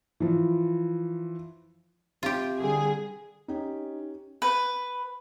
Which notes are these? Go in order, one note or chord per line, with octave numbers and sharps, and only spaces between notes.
E3 F3
C3 F4 G4
D3 G3 G#4
C#4 D#4 G4
B4